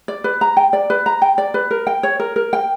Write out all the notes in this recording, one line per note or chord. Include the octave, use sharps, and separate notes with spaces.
D5
B4
A#5
G5
D5
B4
A#5
G5
D5
B4
A#4
G5
C#5
A#4
A#4
G5